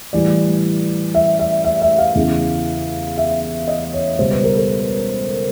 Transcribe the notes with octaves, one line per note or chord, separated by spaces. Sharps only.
A2 E3 G3 D5
E5
E5
E5
E5
F5
E2 C#3 E3
E5
D#5
C#5
C#2 B2 G3 C5
B4
A#4
A4